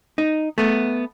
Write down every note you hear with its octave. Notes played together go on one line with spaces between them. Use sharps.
D#4
A3 B3